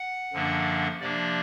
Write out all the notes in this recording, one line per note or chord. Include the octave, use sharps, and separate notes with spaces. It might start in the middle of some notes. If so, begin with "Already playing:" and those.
Already playing: F#5
F#2 D3 F3 A#3 D4
C3 F3 A#3 D4 D5